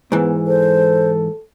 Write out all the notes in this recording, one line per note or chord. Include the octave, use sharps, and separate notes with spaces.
G#2 E3 B3
A4 C5